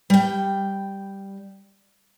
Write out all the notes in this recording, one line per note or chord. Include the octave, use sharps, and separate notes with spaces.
G3 G5